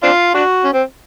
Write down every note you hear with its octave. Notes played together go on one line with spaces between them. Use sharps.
C4 D4 F4
D4 F#4
C#4
C4